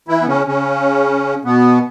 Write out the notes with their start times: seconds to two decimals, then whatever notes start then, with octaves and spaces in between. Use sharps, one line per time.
0.08 E3 E4
0.22 B3
0.27 C#3 C#4
0.47 C#3 C#4
1.45 B2 B3